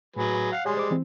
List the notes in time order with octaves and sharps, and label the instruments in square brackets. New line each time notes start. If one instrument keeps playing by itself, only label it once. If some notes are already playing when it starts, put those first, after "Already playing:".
[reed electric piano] A2 [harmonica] F#3 G#4 B4
[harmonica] F5 F#5
[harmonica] G3 G#3 [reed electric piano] C#5 G#5 C6
[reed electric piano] C5 D6
E3 C4